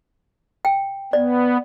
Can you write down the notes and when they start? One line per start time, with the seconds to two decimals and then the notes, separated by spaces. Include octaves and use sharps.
0.65 G5
1.13 B3 D5